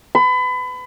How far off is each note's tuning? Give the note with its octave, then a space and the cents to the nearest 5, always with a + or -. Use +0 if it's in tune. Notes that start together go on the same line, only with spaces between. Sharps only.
B5 +30